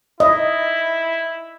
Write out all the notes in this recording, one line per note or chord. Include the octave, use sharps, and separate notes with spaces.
E4 D#5